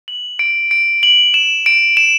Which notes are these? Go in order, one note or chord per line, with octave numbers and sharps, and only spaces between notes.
F#7
D7
D7
F#7
E7
D7
E7